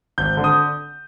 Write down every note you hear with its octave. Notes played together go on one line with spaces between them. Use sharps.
G#1 G6
D3
D#6